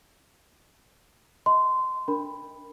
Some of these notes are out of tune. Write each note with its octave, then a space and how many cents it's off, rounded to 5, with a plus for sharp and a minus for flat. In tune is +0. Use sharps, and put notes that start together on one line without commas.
D#5 +25 C6 -20
D4 +0 A#4 +0 B5 +5